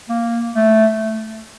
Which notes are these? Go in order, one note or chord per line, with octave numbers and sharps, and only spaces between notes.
A#3
A3